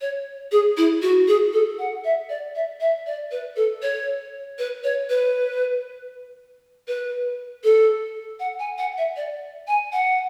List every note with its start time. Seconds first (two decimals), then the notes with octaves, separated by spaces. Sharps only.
0.01 C#5
0.52 G#4
0.77 E4
1.02 F#4
1.28 G#4
1.53 A4
1.79 F#5
2.04 E5
2.29 D5
2.55 E5
2.80 E5
3.06 D5
3.31 B4
3.56 A4
3.82 C#5
4.59 B4
4.84 C#5
5.10 B4
6.88 B4
7.64 A4
8.40 F#5
8.59 G#5
8.78 F#5
8.98 E5
9.16 D5
9.68 G#5
9.93 F#5